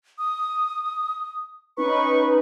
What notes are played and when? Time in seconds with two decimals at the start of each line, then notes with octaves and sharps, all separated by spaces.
0.18 D#6
1.77 C#4 D#4 B4 C#6